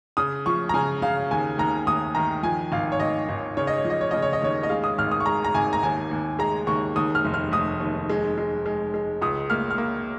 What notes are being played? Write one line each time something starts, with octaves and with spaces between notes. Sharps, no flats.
C#3 D#6
F3 C#6
A#5
C#3 G#5
C#3 F5
D#2 G#5
D#2 A#5
D#2 D#6
D#3 A#5
F3 G#5
G#1 F5
C#5
G#1 D#5
G#1
C#3 C#5
D#5
C#5
F3
D#5
C#5
C#3 D#5
C#5
D#5
D#2 C#5
D#5
G#3 F5
D#6
G#1 F6
D#6
C#6
G#3 A#5
A#5
G#1 G#5
A#5
D#2 G#5
D#2
G#3 A#5
D#2 C#6
D#2 D#6
F6
F1
F6
F1 D#6
D#2
G#3
G#3
G#3
G#3
C#2 D#6
A#3 F6
F6
A#3